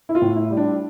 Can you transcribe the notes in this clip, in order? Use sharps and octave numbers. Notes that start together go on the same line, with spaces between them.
E4
F4
A2
E4
G3
D4